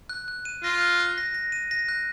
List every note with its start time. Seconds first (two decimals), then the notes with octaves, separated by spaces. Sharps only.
0.09 F#6
0.28 F#6
0.45 D#7
0.63 F4 A#6
0.81 F#6
1.00 F#6
1.18 A#6
1.34 A#6
1.52 D#7
1.71 A#6
1.88 F#6